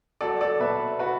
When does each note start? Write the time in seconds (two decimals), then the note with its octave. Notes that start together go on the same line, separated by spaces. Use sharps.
0.21 F#3 A4 D5
0.41 A4 D5
0.60 B2 B4 E5
0.99 F#4 B4